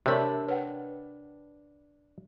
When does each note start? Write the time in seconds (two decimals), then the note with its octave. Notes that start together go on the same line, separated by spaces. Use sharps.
0.06 C3 A3 D4 G4 A#4 C#5 D5 B5
0.48 B4 C#5 F#5 G5